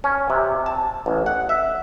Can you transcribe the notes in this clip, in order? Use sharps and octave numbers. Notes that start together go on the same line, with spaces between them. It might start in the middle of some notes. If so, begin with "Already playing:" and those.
C#4
C3
A5
A1
F#5
E5